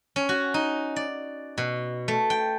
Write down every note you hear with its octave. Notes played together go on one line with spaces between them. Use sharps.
C#4
F#4
D#4
D5
B2
A3
G5